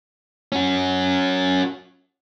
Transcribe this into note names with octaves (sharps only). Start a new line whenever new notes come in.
C#4 F#4